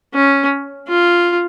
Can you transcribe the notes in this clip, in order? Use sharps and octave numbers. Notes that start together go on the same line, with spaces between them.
C#4
F4